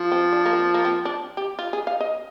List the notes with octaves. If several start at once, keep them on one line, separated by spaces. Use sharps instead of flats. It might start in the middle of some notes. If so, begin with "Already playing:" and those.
Already playing: F3
C4
D4
A#3
C4
A#3
C4
D4
G4
F4
G#4
F5
D#5